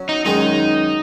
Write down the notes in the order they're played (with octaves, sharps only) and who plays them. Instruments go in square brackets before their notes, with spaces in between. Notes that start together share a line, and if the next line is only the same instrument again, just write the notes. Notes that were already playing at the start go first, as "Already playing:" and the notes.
Already playing: [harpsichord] F#3 C#4
[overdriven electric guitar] D#4
[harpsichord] F#2 D#3 G#3 [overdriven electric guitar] D#4